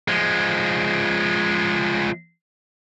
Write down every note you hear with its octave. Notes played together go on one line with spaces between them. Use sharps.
F3 G#3